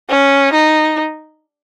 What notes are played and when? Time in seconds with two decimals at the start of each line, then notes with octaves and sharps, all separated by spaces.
0.09 C#4
0.53 D#4